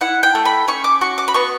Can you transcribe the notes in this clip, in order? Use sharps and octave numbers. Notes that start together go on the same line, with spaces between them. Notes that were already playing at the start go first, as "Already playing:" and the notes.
E4 F#5
G5
A3
B5
C#4 C#6
D6
F#4 C#6
D6
B5
B3 C#6